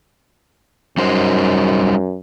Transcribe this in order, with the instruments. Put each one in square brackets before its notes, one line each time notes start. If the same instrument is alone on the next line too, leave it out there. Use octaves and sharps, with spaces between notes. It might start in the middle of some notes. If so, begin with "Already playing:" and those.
[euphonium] F#2 [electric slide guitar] G3 D#4 C5